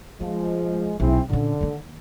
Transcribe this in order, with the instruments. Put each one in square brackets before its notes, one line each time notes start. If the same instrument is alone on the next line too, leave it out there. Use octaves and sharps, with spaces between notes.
[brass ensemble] F3 G#3 [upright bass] A3
[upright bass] D#1 B1 [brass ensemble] C4 E4 G#4
[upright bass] A#2 C#4 [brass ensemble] D3
[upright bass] D#3 A#3